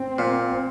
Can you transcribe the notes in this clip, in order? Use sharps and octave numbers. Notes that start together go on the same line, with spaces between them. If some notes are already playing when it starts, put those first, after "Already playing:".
Already playing: C4
A#2